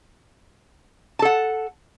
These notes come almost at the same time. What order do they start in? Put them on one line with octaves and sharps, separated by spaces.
A5 A4 F#5